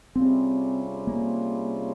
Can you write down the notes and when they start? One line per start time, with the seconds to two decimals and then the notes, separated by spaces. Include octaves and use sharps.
0.16 C3 G3 C4 C#4 F4 G#4
1.07 A#3